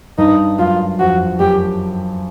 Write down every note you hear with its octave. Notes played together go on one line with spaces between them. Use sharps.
G2 D#4
F#2 F4
F2 F#4
F#2 G4